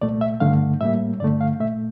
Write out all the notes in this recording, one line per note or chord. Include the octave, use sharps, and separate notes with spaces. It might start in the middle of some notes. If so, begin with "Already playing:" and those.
C2 A#2 A3 D5
E5
G2 D3 A3 F5
A2 G3 A#3 E5
G2 D3 A3 D5
F5
A#2 A3 E5